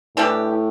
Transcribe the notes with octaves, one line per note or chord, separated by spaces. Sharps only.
A2 E3 G3 D4 G4